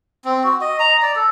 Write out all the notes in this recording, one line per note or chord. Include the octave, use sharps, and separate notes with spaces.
C4
F#4
D#5
A#5
D5
A4